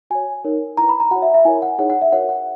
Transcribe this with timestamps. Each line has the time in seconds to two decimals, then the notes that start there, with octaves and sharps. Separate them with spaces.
0.10 F#4 C#5 G#5
0.44 D#4 A#4 C#5
0.77 E4 B4 A#5
0.89 B5
1.00 A#5
1.11 F#4 F#5
1.16 C#5
1.22 E5
1.34 E5
1.45 E4 A#4 C#5 G#5
1.62 F#5
1.79 D#4 G#4 C#5 F#5
1.90 F#5
2.02 E5
2.12 F#4 A#4 C#5 F#5
2.29 F#5